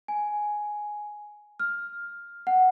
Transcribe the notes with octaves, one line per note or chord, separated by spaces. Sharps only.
G#5
F6
F#5